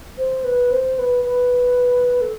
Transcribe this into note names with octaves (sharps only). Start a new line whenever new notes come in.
C5
B4
C5
B4
B4
A4